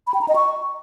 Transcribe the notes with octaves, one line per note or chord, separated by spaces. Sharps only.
B5
G5
A#5
D#5
C#6